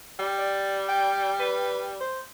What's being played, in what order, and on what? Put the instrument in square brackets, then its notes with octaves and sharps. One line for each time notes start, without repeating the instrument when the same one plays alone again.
[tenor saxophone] G3
[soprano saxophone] D5
G5
B4
C5